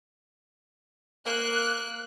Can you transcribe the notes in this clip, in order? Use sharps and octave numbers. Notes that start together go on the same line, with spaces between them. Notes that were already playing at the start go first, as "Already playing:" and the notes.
A#3 F#6